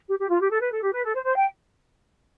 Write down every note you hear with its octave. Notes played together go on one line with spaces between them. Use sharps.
G4
G4
F4
G4
A4
B4
A4
G4
B4
A4
C5
C5
G5